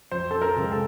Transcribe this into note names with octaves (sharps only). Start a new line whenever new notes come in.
F2 C5
A4
A#4
C3 F3 G#3
A4